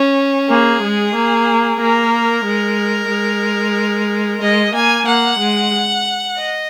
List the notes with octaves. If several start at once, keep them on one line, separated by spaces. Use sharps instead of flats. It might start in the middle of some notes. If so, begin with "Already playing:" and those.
Already playing: C#4
A#3 G#4
G#3
A#3
A#3 A#4
G#3
G#3
G#3 D#5
A#3 G#5
A#3 F#5
G#3
D#5